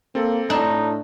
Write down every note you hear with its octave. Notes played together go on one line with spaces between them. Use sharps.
A#3 C4 A4
A2 D4 D#4